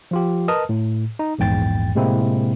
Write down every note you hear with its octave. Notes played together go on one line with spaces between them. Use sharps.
F3 F4 G4
A#4 B4 D#5 A5 D#6 F6
A2
D#4
A#1 E2 G#2 G5 A6
A2 C3 G#3 A#3 C4 E4